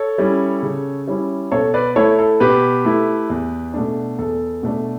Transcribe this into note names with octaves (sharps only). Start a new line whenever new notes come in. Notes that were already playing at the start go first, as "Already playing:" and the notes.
Already playing: A4 C#5
G3 C#4 E4
C#3
G3 C#4 E4
B2 A4 C#5
B4 D5
A3 E4 A4 C#5
A4
B2 G4 B4
A3 E4
E2
B2 A3 D4
E2 A4
B2 A3 D4